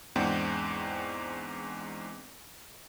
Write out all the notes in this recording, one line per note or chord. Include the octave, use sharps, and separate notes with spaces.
E2 G#2 C4 D4 F#5 G5